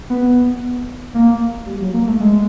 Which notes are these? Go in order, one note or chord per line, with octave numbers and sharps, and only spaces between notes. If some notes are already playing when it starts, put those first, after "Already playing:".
B3
A#3
G3
F#3
A#3
A3
G#3